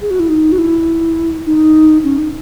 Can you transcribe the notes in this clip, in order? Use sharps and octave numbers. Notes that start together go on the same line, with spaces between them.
G#4
F#4
E4
D#4
F#4
E4
D#4
C#4
D#4